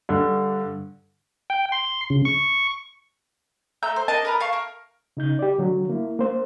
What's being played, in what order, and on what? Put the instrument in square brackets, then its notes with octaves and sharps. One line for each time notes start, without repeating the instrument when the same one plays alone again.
[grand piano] G2 D3
[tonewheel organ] G5
C6
C#3
C#6
[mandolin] A3 A#5 E6 G6
C5
D4 A#4 D#5 A5
A#4 B4 A#5
F5 A5 C#6
A#4
[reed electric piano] C#3 D#4 G6
G4 D5
D3 F#3
A#3 E4
A#3 C5